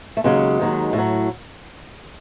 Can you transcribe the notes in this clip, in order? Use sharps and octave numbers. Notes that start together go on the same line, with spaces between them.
A3
D#2 C#3 F#3 G#3
D#2 D#3 F#3
A2
F#3